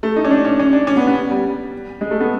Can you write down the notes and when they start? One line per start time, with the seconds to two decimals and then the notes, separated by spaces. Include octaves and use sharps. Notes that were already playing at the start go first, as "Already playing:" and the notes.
0.03 A3
0.16 D#4
0.24 C#4
0.31 D4
0.45 C#4
0.59 C#4
0.73 D4
0.87 C#4
0.97 B3
1.07 B3
1.31 G3
2.01 G#3
2.11 A3
2.20 B3